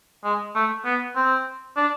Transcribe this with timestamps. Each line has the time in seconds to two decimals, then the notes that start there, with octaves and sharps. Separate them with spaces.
0.24 G#3
0.55 A3
0.85 B3
1.16 C4
1.77 D4